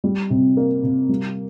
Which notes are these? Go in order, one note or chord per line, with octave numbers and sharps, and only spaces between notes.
G3
C3
A#3
C3
G3